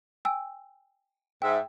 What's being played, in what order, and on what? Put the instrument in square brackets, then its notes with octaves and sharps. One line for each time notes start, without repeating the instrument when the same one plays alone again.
[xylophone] G5 G#5 E6
[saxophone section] G#2 E5 [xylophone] G5